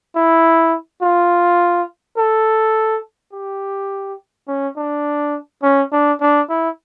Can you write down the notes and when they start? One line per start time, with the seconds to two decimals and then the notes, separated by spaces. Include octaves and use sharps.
0.16 E4
1.02 F4
2.18 A4
3.33 G4
4.48 C#4
4.77 D4
5.63 C#4
5.92 D4
6.21 D4
6.49 E4